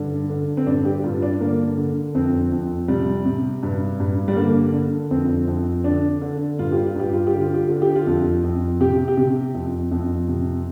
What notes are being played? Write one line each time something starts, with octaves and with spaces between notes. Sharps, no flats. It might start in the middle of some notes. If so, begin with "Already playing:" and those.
Already playing: G2 D3
D3
C4
G2 D4
G4
G2 F4
D4
D3 A#3
D3
F2 C4
F2
C3 G3
C3
G2
G2
G3
D3 A#3
D3
F2 C4
F2
D3 D4
D3
G2 F4
G4
F4
G2 G4
F4
G4
D3
F4
G4
D3 F4
G4
F4
F2
F2
C3 G4
G4
C3
F2
F2
C3